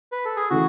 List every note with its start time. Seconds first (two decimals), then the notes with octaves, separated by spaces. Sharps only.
0.12 B4
0.25 A4
0.36 G#4
0.50 C#3 E3 A3 E4 F#4